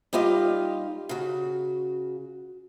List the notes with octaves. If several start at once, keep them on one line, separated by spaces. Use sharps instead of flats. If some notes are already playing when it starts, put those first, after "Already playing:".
G3 D#4 F4 G4 D#5 F5
C#3 F#4